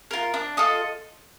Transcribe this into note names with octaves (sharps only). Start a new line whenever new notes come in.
F4 A#4
D4
F4 A4 D#5